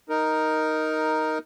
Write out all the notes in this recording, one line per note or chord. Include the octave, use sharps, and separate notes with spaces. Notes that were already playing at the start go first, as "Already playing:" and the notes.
D#4 A#4